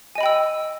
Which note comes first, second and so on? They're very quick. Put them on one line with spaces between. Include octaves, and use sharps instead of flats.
G#5 D#5 B5 G5 E6